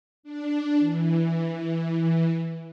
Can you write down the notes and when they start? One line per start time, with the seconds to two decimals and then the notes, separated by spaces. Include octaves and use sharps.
0.23 D4
0.79 E3